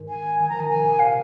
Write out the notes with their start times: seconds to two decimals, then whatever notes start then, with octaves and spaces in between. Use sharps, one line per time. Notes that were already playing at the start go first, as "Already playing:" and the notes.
Already playing: G#2 D#3
0.09 G#5
0.39 D#3 G#5
0.49 F3 A#5
0.59 D#3 G#5
0.69 C3 G#5
0.84 A#2
0.99 C3 F5